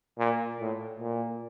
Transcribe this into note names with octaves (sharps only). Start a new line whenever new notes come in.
A#2
A2
A#2